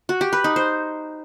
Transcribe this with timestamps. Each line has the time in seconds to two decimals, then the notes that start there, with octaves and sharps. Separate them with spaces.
0.09 F#4
0.21 G4
0.33 B4
0.44 D#4
0.56 C5